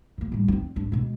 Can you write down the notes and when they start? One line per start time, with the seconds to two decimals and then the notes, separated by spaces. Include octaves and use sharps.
0.18 D#3 A#3
0.32 A2 G3
0.48 C4 D#4
0.76 G#1 D4
0.92 B2 G#3